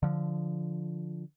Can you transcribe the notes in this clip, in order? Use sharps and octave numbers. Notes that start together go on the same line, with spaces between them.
D3 F3